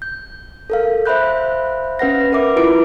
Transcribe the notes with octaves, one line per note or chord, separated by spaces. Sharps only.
G6
A4 A#4 F5
C5 E5 F5 B5 F#6 G6
C#4 B4 F#5 A#6
A#4 B4 E5 D6
E4 F4 B4 D7